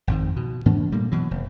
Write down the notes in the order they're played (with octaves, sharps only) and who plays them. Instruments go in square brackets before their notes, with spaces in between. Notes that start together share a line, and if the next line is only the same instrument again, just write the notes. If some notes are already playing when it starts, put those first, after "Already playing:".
[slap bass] G#1 F2 G#2
B2
G#2 E3 A#3 D4
A#2 G3 A3 A#3
B2 E3 F#3
F1